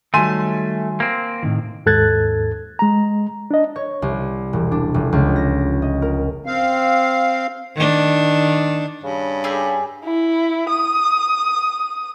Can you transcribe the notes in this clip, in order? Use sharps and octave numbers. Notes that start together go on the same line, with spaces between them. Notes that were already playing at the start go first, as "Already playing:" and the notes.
D#3 F#3 G3 A3 G#5 C6 D#7
A#3 C4
A2 C3 D#3
D#2 G#2 A4 F#6 G#6 A6
G#3 A#5
D4 D#5
C#5
C2
E1
D4
F1
C#2
A#6
D#5
A#4
C4 F5
D#3 D4
G2 C#3
G4 G#4 E6
E4
D#6